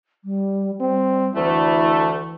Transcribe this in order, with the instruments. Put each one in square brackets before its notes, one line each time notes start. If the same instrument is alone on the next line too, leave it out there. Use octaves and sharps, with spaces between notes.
[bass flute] G3
[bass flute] G3 [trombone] C4
[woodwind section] D2 A3 [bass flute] E3 [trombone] E4